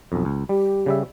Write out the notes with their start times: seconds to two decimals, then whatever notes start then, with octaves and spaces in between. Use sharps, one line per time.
0.12 B1 F2
0.25 C#2
0.49 G3 G4
0.86 C#3 G3 E5